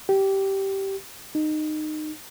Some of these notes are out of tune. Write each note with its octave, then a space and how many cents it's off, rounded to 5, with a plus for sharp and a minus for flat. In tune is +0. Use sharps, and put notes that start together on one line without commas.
G4 -15
D#4 -20